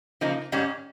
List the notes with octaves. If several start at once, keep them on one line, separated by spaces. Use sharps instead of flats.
C#3 F3 A#3 D#4
G#2 D#3 G3 C#4